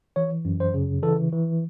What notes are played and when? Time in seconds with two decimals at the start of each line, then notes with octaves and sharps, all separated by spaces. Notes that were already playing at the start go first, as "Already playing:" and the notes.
0.16 E3 C#5
0.45 F#2
0.60 C5
0.74 C#3
1.03 E3 A4
1.32 E3